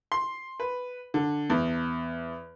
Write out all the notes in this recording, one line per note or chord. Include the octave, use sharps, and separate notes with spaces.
C6
B4
D3
E2